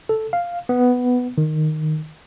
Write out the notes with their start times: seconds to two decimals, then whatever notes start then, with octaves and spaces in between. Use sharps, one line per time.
0.09 A4
0.33 F5
0.69 B3
1.38 D#3